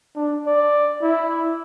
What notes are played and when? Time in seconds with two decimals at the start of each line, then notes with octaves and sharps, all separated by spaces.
0.16 D4
0.46 D5
1.02 E4